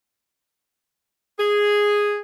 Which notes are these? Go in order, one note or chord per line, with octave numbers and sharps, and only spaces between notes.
G#4